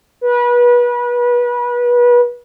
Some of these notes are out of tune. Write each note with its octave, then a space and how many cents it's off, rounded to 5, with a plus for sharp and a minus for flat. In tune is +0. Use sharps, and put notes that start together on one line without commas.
B4 -30